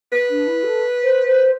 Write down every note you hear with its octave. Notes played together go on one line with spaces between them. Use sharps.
B4
D4
E4
A4
C5
C5